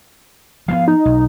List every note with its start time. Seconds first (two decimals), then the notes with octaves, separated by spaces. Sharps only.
0.68 F3 G3 B3 F5
0.88 D#4
1.05 B1